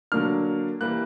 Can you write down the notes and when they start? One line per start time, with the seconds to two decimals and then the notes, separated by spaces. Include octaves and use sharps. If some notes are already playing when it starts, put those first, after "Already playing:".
0.12 D3 F#3 A#3 D4 F6
0.81 E3 G3 A#3 F#6